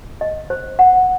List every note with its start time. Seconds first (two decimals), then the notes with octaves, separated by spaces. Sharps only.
0.21 D#5
0.50 C5
0.79 F#5